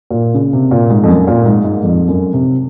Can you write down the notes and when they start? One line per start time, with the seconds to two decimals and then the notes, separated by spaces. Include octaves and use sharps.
0.11 A#2
0.34 C#3
0.53 C3
0.71 A#2
0.90 G#2
1.03 F2
1.09 F#2
1.27 A#2
1.46 G#2
1.64 G#2
1.84 F2
2.08 F#2
2.33 C3